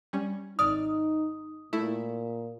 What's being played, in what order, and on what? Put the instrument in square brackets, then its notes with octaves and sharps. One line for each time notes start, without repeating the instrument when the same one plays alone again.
[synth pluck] G3 C#4
[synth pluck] G#1 D5 F6 [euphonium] D#4 [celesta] D#6
[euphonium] A#2 [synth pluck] A3 E4